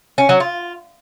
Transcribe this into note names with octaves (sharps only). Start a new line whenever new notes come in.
C#4
F#3
F4